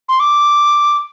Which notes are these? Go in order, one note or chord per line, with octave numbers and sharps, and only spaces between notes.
C6
D6